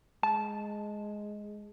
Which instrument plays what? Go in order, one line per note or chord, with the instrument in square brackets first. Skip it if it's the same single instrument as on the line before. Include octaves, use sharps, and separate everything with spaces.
[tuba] G#3 [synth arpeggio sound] A5